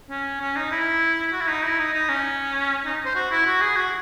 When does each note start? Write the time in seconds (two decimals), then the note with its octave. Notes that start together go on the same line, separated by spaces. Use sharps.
0.10 C#4
0.41 C#4
0.56 D#4
0.72 E4
1.32 F#4
1.41 E4
1.47 D#4
1.63 E4
1.79 D#4
1.93 D#4
2.09 C#4
2.85 D#4
3.05 C5
3.15 F#4
3.31 E4
3.46 F#4
3.61 G#4
3.76 F#4